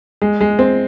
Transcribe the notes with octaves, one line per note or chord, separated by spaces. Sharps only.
G#3
G#3
C4